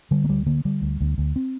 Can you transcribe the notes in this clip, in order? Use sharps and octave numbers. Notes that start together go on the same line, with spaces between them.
D3 G3
A#3
D2 G3
D3 A#3
D3 G3
D2
D2
D2
C4